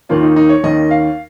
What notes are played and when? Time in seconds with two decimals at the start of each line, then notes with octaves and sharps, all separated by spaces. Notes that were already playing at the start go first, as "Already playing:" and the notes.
0.09 D#2 D#3 A#3 C#4 F4
0.22 D#4
0.36 D#4
0.49 C#5
0.63 D#2 D#3 A#3 C#4 D#5
0.91 F5